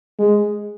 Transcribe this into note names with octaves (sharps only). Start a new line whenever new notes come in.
G#3